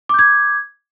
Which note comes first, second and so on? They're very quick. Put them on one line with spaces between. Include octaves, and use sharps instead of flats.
D6 G6 G#6